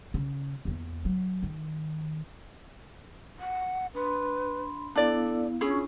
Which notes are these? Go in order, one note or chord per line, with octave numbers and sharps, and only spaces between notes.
C#3
E2 A#3
F#3
D#3
F#5
D4 B4 B5 C6
B3 D4 E4 A4 D5 F5
C#4 D4 E4 F4 G#4 C#6